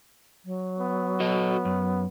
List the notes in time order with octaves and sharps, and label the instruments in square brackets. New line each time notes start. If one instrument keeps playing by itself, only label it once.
[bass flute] F#3
[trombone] B3
[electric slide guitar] F#4 A4 D#5
F#2